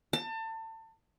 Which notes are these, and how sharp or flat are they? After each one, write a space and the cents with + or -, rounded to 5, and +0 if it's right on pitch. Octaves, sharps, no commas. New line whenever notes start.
A5 +30